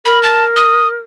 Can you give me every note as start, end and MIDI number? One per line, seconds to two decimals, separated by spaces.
0.05 0.98 70
0.05 0.21 83
0.23 0.44 81
0.56 0.88 87